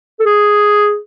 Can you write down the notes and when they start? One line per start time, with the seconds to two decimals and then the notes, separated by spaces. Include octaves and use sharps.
0.20 A4
0.25 G#4